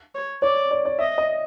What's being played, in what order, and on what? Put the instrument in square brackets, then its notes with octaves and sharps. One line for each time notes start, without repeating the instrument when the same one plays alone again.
[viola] C#5
[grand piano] C#5 [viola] D5
[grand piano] D5
D5
[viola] D#5 [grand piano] E5
[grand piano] D#5